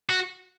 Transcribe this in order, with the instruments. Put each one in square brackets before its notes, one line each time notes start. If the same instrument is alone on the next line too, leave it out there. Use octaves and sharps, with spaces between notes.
[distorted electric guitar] F#4